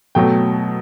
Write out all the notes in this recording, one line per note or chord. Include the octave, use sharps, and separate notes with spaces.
B2 F#3 A3 G5